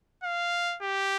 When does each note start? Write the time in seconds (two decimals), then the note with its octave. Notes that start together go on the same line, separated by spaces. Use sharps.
0.24 F5
0.82 G4